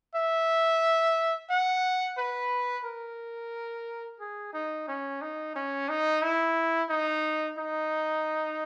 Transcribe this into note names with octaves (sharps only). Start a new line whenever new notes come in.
E5
F#5
B4
A#4
G#4
D#4
C#4
D#4
C#4
D#4
E4
D#4
D#4